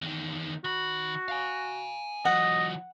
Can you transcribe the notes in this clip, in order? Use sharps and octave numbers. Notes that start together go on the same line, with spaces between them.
E2 D#3
D#3 F#4 B5
F5 G#5
E3 F#3 D#5 F#5